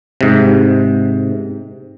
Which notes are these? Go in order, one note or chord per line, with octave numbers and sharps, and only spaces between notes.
G#2 C3